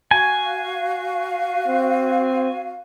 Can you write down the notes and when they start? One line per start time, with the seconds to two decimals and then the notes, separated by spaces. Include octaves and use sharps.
0.11 F#4 F5 G#5
1.67 C4